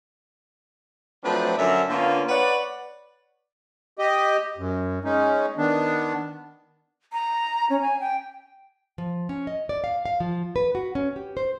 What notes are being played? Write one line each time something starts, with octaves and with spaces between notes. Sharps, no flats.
F3 F#3 A3 C4 D4 B4
F#2 D3 F#3 A#4 E5
D3 A#3 B3 C#4 F4
B4 C#5 D5 F#5
G4 D#5
F#2
G#3 C#4 D#4
D#3 B3 D4
A#5
C#4
G#5
G5
F3
C#4
D#5
D5
F5
F5
F3
B4
F#4
C#4
G4
C5